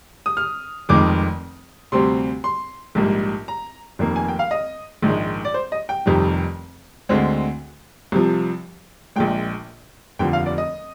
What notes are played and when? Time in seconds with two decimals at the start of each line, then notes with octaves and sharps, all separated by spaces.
0.26 D#6
0.37 F6
0.89 F1 F2 D#3 G#3 D6
1.92 D2 C3 G3 C4 C6
2.44 C6
2.95 A#1 G#2 G3 A#3
3.48 A#5
3.99 F1 F2 D#3 A#3
4.16 G#5
4.28 G5
4.39 F5
4.51 D#5
5.03 A#1 G#2 D#3 G#3
5.45 D5
5.54 C5
5.72 D#5
5.89 G5
6.06 F1 F2 C3 D#3 G3
7.09 D2 D3 G#3 C4
8.12 C2 C3 F3
9.16 A#1 A#2 G#3 G5
10.19 F1 D#2 D3 F3 G5
10.33 F5
10.46 D5
10.58 D#5